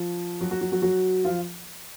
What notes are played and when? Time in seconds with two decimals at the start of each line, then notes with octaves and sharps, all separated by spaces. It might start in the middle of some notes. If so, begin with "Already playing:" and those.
Already playing: F3
0.41 F#3 F#4
0.51 F#3 F#4
0.61 F#3 F#4
0.72 F#3 F#4
0.82 F#3 F#4
1.24 F3 F4